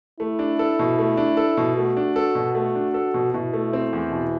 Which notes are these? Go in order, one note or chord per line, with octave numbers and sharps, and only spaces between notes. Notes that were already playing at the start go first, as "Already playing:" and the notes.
A3 E4
D4
A4
B2
A3
D4
A4
B2
A3 F#4
D4
A4
B2
A3
D4
A4
B2
B2 E4
A3
C4
E2
B2